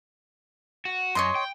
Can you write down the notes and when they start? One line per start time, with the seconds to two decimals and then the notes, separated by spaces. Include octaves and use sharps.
0.85 F#4
1.15 F#2 C#5 D#5 C6
1.35 G5